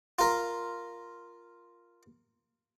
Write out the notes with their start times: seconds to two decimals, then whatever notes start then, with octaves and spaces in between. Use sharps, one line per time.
0.19 F4 A#4